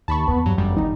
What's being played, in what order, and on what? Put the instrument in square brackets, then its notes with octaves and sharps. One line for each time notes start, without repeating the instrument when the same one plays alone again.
[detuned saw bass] D#2 [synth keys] A5 B5 C#6
[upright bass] E2 [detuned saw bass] B3
[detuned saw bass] G2 [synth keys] F#3
[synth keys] G1 G3 [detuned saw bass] F#2
[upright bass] D#3 F4 [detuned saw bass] D#4